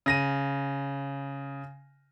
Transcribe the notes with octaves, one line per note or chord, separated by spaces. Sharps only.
C#3 A#6 D#7